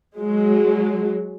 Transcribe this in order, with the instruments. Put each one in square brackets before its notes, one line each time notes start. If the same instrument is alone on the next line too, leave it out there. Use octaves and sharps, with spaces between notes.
[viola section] F#3 G#3